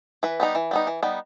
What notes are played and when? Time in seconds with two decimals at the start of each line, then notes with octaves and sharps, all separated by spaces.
0.23 E3 B4
0.40 G3 B3 D#4
0.55 E3
0.71 G3 B3 D#4
0.87 E3
1.03 G3 B3 D#4